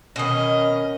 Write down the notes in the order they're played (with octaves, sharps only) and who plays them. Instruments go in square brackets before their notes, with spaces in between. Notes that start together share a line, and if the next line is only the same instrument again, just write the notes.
[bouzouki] B2 D#3 [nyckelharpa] C#4 D#5